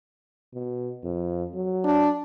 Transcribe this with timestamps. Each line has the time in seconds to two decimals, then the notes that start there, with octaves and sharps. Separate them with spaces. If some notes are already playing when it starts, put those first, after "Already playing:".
0.54 B2
1.04 F2
1.55 F#3
1.85 D4